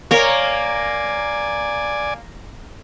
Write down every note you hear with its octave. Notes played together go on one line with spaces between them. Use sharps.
A#3 A#4 C#5 D5 G#5